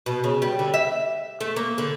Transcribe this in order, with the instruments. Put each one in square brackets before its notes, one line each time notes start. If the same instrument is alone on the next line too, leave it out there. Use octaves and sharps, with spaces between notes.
[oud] B2
C#3
G3
D3
E5
A3
A#3
D3